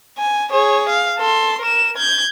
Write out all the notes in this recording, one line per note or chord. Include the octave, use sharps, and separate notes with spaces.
G#5
G#4 C#5
F5
A4 C6
A#4 E7
G6 G#6